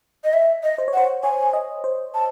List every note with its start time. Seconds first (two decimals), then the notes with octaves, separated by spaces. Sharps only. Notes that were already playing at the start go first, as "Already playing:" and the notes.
0.24 D#5
0.33 E5
0.63 D#5
0.78 C5
0.88 C#5
0.94 C5 F#5
1.23 C#5 G#5
1.53 D#5
1.84 C5
2.14 A5